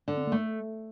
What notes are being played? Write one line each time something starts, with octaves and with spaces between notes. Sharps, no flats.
D3 D4
C4
A#3
A3